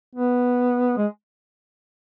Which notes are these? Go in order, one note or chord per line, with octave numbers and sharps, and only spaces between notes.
B3
G#3